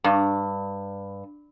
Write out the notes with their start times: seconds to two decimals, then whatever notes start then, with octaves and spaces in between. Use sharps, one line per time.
0.04 G2